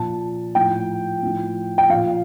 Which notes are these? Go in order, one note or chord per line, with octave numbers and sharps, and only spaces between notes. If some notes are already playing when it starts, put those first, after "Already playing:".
Already playing: A#2 F3 A5
A2 F3 G5
A2 F3
G5
A#2 F3 F5